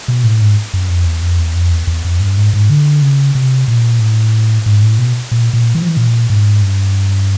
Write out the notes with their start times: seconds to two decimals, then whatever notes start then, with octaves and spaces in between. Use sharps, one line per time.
0.08 B2
0.24 A2
0.41 G#2
0.74 F#2
0.89 F2
1.06 E2
1.22 F2
1.38 E2
1.55 F2
1.72 E2
1.87 E2
2.04 F2
2.20 G2
2.37 G#2
2.53 G#2
2.70 D3
3.02 C#3
3.35 C3
3.68 A#2
4.00 A2
4.66 G#2
4.82 A2
4.98 B2
5.31 A#2
5.53 A#2
5.75 E3
5.82 F3
5.89 E3
5.97 A#2
6.30 G#2
6.62 G2